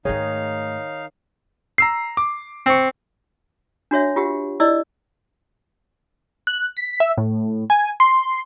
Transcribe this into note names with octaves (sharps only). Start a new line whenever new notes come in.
G#2 D#3 A3 D#4 G#4 C#5 F5
A#5 E6 C7
D6
C4 C#6
D4 F#4 C#5 E5
F4 G4 F#5
E4 D5 D#5 E6
F#6
B6
E5
A2
G#5
C6